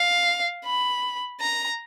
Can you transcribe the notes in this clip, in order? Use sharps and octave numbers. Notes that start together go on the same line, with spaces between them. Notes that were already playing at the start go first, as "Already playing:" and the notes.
Already playing: F5
B5
A#5